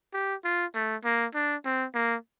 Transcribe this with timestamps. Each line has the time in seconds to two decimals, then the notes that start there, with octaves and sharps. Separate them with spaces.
0.13 G4
0.44 F4
0.75 A3
1.05 A#3
1.35 D4
1.65 C4
1.95 A#3